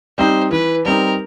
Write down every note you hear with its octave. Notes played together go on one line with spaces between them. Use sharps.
G3 C4 D#4 C5
E3 B4
G3 C4 D#4 A#4